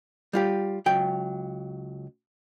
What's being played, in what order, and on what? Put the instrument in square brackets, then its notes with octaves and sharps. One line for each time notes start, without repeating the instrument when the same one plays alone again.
[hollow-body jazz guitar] G3 F4 G4
C#2 F#3 G5